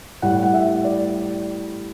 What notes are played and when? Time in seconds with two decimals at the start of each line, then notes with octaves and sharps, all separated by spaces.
0.22 A2 G3 F#5
0.43 F#5
0.54 E5
0.84 D5